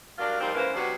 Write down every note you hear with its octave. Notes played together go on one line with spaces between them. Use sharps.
F#3 G3 D4 F4 A#4
F3 G3 A#3 C4 D#4 A#4
G#2 C#3 E3 A#3 B4 C5
C3 F#3 B3 C#4 D4 F#4